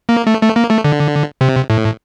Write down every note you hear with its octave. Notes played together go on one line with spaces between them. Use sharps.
A#3
A3
A3
A#3
A3
D3
C3
A2